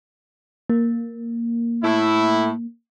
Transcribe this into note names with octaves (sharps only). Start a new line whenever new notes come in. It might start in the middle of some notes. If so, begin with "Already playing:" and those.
A#3
A2 E4